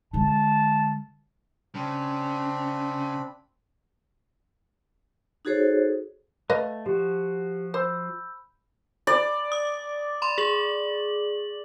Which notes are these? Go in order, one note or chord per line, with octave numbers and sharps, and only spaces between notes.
D3 G#3 A5
C#3 C4 D4 B5
D#4 F#4 G#4 A4 C5 C#5
A3 B4 D#5 F5
F3 F#4 G4
C5 B5 E6 G6
D5
D#6
B5 C6
G#4 F#7